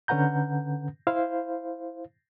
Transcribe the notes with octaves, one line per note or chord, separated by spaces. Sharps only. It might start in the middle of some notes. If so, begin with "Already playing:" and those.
D3 C#4 B4 F#5 A#5 G6
E4 C5 F5